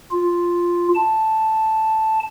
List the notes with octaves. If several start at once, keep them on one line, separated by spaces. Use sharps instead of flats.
F4
A5